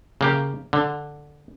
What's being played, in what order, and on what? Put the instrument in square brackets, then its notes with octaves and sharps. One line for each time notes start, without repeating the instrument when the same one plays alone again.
[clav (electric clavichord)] C#3 A#3 G4
D3